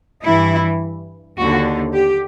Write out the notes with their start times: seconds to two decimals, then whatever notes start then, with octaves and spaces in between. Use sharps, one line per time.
0.23 G2 E3 E4
1.38 D#2 D3 F#4
1.95 G4